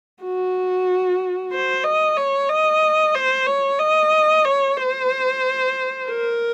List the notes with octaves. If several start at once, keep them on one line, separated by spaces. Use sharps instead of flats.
F#4
C5
D#5
C#5
D#5
C5
C#5
D#5
C#5
C5
A#4